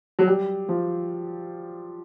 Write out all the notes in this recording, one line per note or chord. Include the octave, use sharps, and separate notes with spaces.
F#3
G3
F3